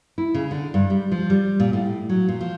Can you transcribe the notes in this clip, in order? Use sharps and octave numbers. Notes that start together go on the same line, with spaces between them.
E4
C#3
D3
G2
G3
F3
G3
A#2
A2
F#3
A#2
F3